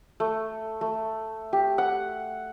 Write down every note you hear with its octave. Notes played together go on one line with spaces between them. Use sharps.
A3
A3
G4
F#5